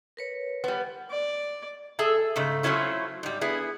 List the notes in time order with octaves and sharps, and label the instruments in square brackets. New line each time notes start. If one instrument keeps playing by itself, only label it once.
[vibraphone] A#4 B4 C#5
[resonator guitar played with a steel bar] G3 B3
[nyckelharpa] D5
[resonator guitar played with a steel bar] G#4 A4 E5 G#5
G#2 C#3 A3
F#3 A3 C4 C#4 E4 F4
G#2 G3
B3 E4 G#4